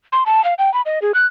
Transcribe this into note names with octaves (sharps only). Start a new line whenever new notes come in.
C6
A5
F5
G5
B5
D#5
G#4
F#6